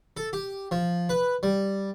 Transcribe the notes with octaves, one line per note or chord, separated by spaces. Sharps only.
A4
G4
F3
B4
G3